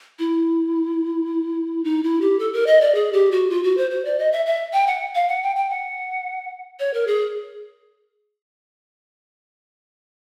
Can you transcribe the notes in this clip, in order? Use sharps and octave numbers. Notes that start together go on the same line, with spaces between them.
E4
D#4
E4
G4
A4
A#4
D#5
D5
G#4
G4
F#4
F4
F#4
C5
C5
D5
D#5
E5
E5
G5
F#5
F5
F#5
G5
G5
F#5
C#5
A#4
G#4